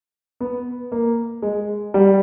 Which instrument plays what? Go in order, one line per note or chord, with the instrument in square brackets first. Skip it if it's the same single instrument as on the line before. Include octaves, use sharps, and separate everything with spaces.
[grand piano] B3
A#3
G#3
G3